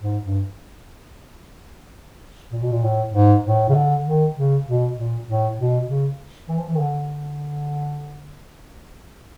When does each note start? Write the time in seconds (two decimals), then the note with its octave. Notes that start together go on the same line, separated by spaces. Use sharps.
0.01 G#2
0.24 G2
2.52 A#2
2.62 B2
2.71 A#2
2.83 A2
3.13 G#2
3.44 A2
3.69 C#3
3.74 D3
4.05 D#3
4.35 C#3
4.66 B2
4.96 A#2
5.27 A2
5.57 B2
5.87 C#3
6.48 E3
6.58 F3
6.67 E3
6.74 D#3
6.79 D3